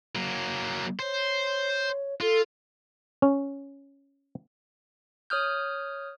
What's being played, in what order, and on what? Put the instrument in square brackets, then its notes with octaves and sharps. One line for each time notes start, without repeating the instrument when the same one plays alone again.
[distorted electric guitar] F#3 A#3
[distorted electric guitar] C5 [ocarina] C#5
[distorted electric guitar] F4 [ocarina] A4
[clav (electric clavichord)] C#4
[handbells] C#5 D#6 F6 G6